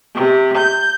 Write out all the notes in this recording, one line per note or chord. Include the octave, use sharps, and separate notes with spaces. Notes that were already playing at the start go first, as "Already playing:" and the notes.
C3
G6